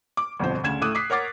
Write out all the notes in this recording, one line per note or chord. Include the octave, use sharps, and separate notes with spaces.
D6
G1 F2 B2 C5
D2 C#3 G#6 E7
A2 A3 D6 D#6 F#6 D#7
D6 D#6 B6 C7
A#4 C#5 F#5 D6 A6